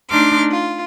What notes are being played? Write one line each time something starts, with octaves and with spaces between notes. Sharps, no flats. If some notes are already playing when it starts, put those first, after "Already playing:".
A3 D4 D#4 C6 D6 F6
F4